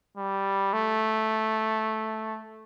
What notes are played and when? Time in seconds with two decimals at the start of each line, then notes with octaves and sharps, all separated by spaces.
0.18 G3
0.73 A3